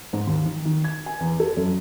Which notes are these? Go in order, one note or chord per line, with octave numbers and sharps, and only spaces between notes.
G#2
D#2
D#3
D#3
G#6
G#5
E2
A4
F#2